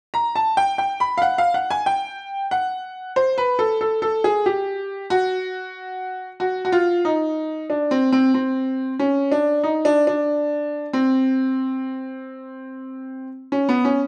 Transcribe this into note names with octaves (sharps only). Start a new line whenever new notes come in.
A#5
A5
G5
G5
B5
F5
F#5
F5
F#5
G#5
G5
F#5
C5
B4
A4
A4
A4
G#4
G4
F#4
F#4
F#4
F4
D#4
D4
C4
C4
C4
C#4
D4
D#4
D4
D4
C4
C#4
B3
C#4